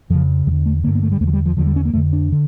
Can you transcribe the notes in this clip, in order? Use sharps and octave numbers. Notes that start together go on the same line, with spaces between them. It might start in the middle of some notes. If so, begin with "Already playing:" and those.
F2 C#3 F3
E2 D3 F3
A3
G2 D3 A#3
A#3
A3
G3
E2 D3 F3 A3
G3
F3
E2 D3 F3
G3
C#4
A#3
F2 D3 A3
D4
D3